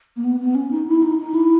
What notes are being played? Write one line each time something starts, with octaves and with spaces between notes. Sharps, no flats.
A#3
B3
B3
C#4
D#4
E4
D#4
D#4
E4